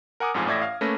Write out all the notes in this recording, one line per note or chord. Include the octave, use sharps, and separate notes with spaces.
A#4 F#5 G#5 D6 D#6
A1 F2 G#2 F4 F5 G#5
A1 A2 D5 E5 G#6 A#6
F5 F6
A3 A#3 C#4 B4 A#6